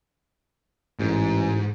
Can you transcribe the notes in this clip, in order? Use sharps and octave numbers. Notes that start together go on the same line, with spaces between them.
A1 G#2